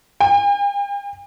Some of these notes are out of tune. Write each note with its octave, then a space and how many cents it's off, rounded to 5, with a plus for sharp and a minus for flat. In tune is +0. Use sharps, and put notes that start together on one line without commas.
G5 +45